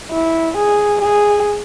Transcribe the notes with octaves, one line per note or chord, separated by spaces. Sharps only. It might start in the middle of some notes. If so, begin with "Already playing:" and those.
E4
G#4
G#4